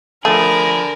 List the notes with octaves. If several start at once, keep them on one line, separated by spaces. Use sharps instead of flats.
D3 F3 A3 G#4 A#4 G#5 B5